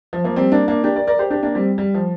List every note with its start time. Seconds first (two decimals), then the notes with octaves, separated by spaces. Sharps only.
0.13 F3
0.24 F3 A#3
0.36 G3 C4
0.52 A#3 D4
0.68 A#3 D4
0.84 D4 G4
0.96 A#4 D5
1.07 A#4 D5
1.19 G4 C5
1.31 D4 G4
1.43 A#3 D4
1.55 G3 C4
1.78 G3
1.94 F3